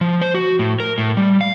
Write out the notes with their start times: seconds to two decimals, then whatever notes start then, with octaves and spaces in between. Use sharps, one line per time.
0.01 F3
0.22 C5
0.34 F#4
0.59 A2
0.80 A#4
0.98 A2
1.17 G3
1.41 F5